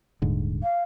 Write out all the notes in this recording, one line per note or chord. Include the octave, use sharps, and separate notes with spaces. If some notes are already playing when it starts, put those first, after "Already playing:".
D#1 G#2 D3
F5